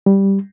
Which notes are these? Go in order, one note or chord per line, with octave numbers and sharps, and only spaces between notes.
G3